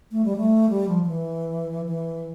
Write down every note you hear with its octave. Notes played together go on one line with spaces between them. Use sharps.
A3
G3
A3
G3
F3
F3
E3
E3